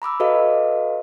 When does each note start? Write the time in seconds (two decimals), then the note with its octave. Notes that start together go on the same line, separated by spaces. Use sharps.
0.02 A#5 B5 D6 E6
0.20 F#4 A4 B4 D#5 F5